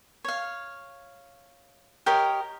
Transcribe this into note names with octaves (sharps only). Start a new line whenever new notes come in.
C#5 F5
G4 A#4 C#5 D#5